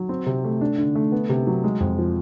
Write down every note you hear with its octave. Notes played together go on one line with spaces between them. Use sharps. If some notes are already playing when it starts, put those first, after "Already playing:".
Already playing: F#3
C4
C3
A3
D4
D3
A3
B3
C3
F#3
G#3
F2
F3